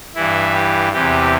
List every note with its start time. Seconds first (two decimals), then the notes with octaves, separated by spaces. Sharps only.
0.15 G2 E3 E4
0.54 G4
0.92 E2 C3 E3 G4